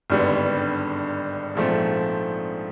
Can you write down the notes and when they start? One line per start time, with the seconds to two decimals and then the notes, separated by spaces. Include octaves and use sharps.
0.10 G#1 G2 D3 G3 B3
1.55 A#1 G#2 F3 A3 C4